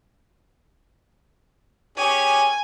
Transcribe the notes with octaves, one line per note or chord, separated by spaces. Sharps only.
C#4 G4 G#4 G#5